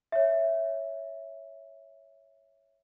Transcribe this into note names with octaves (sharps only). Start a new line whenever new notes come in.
C#5 E5